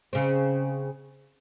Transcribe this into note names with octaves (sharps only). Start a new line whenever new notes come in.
C#3 C4